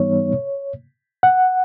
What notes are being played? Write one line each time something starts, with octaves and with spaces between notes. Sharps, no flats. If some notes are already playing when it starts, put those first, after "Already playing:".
Already playing: G#2 E3 G3 B3 D#4 C#5
F#5